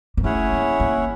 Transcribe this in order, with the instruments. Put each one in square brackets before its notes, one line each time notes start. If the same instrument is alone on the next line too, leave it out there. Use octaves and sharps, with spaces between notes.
[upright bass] A#3
[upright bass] A3 [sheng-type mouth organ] C#4 E4 G#4 C#5 F#5
[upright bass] A#3
A#3